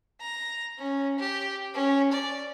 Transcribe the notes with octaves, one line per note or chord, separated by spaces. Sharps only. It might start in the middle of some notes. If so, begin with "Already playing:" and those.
A#5
C#4
G4
C#4
D5